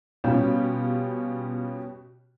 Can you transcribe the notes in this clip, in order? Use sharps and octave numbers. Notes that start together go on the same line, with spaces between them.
B2 G3 C#4 F4 G4